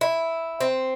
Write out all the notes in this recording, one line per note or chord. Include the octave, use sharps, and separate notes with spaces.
E4
C4